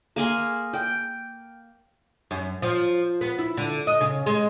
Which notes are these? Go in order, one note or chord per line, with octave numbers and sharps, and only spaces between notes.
A#3 G#4 G#5 C6
G5
F#2
F3
B3
E4
D3
D#5
C#3
G#3